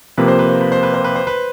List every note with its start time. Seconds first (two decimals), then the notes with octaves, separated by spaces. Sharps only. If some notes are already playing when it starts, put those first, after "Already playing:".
0.17 C3 F3 A#3 B4
0.28 C5
0.39 B4
0.50 C5
0.61 B4
0.72 C5
0.83 B4
0.94 C5
1.04 B4
1.16 C5
1.27 B4